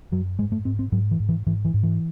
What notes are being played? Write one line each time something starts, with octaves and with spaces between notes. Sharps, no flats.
F#2 F#3
G#2 G#3
A3
G#2 C4
C4
G#2 F#3
E3
G#2
E3
G#2 E3
E3
G#2
E3